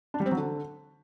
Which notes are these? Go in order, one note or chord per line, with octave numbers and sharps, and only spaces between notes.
D4
G3
C4
F#3
D3